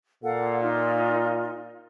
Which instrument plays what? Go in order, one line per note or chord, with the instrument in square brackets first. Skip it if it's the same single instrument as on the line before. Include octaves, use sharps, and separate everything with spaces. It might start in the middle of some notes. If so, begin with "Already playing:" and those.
[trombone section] A#2 [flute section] A4 F5 F#5
[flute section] D#4 F4